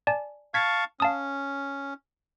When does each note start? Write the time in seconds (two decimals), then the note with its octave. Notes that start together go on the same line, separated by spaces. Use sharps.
0.07 D5 G#5 A5
0.54 F5 A5 C#6 G#6 B6
1.00 C#4 F5 A5 D#6